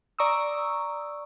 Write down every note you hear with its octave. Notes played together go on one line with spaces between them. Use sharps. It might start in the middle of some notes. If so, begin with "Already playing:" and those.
D5 A#5 C#6 D#6 E6